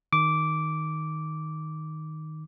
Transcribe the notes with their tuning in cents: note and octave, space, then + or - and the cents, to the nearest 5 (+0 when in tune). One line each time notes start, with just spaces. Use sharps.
D#3 +0 D6 -10